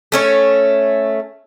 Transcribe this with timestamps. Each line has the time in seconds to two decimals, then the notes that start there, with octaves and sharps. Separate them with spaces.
0.12 A3 C#4 C#5